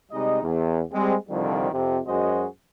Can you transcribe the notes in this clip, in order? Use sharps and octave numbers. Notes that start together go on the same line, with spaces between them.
C3 G3 G#3 D#4 D#5
E2
G3 G#3 C4
C2 F2 D3 D#3 F3 G3
F2 C3
F#2 G#3 F#4 G#4 C5 D#5